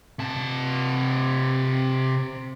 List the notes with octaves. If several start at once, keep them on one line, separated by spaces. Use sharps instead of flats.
C3 A5